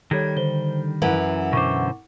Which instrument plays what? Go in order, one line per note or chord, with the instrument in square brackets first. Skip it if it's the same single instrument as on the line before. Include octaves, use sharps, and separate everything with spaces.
[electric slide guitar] D#3 G3 [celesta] G4 A4 C#5 [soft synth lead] G#6
[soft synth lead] D3 [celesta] C5 G7
[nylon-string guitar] F#2 E3 [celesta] B4 [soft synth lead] F#5
[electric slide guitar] B2 D3 C5 [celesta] C#6 D6